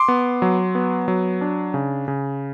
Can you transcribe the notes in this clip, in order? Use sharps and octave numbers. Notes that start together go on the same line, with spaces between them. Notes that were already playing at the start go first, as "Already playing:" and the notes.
Already playing: C6 D6
B3
F#3
B3
F#3
D4
C#3
C#3